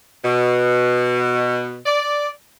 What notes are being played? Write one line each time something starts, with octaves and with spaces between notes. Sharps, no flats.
B2
D5